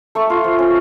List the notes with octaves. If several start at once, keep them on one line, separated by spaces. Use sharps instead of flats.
A3 C#6
F4
F3
C#4